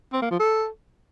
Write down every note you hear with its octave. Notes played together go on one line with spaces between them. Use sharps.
C4
A#3
F3
A4